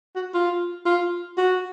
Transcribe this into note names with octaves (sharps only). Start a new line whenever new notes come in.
F#4
F4
F4
F#4